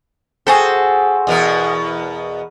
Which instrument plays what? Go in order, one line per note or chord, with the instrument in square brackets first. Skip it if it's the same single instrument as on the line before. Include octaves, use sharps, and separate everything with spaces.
[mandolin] F#4 G#4 C5 [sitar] A4
[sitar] E2 B2 A#4